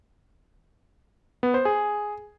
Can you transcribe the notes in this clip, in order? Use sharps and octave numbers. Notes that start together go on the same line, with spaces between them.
B3
C5
G#4